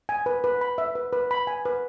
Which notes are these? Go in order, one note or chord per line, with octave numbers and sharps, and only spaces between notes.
G#5
B4
B4
B5
E5
B4
B4
B5
G#5
B4